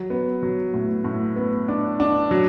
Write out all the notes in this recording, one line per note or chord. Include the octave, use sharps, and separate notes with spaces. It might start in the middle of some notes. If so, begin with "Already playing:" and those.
Already playing: F#3
B3
F#3
A2
A2
B3
D4
D4
F#3